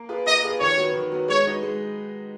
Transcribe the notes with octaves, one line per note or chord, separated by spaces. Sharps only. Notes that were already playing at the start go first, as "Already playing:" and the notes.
Already playing: A#3
F4 G#4 B4
A#3 D#5
F4 G#4 B4
D#3 C#5
F#3 B3 F#4
D#3
F#3 B3 F#4
G#3 C#5
D#4 F#4 B4
G#3